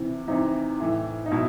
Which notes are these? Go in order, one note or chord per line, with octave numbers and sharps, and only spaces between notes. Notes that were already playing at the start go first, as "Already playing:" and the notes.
Already playing: C3 E3
C3 E3 D#4
A2 E3
D#4
B2 E4